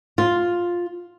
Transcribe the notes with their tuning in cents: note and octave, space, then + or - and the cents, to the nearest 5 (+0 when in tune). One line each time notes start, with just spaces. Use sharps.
F4 +5